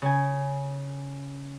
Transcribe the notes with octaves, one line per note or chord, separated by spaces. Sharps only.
C#3 G#5